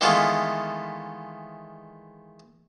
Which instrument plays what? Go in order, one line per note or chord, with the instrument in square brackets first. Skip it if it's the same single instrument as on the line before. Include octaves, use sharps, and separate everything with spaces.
[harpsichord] D#3 E3 G#3 A3 B3 F4